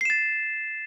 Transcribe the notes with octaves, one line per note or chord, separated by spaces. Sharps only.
A6 C7 E7